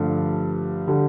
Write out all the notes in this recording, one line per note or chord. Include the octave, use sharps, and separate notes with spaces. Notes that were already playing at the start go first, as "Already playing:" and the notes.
Already playing: G2 D3 F3 A3
D3 G3